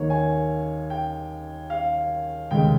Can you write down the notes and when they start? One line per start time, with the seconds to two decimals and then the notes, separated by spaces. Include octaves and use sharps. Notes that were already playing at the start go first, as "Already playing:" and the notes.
Already playing: D#2 D#3 A#3 C#5
0.10 G#5
0.90 G5
1.70 F5
2.51 F1 D#2 C#3 G#3 G5